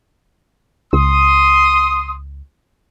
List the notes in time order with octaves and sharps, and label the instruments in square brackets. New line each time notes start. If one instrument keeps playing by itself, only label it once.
[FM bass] C#2 [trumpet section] C6 D#6